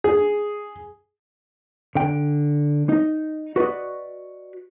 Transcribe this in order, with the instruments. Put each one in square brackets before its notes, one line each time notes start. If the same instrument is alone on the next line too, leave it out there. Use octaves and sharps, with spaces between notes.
[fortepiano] G#4
[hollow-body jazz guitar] D3 G5
D#4 D#5
F#4 B4 D5 D#5